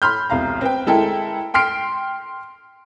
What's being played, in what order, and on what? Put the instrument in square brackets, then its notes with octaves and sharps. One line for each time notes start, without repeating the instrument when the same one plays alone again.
[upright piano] B5 C6 F6 G6
E1 C2 F5 A#5
C4 B4 G5
G#3 E4 A4 A#4 G5
G5 C6 F6 C7 D7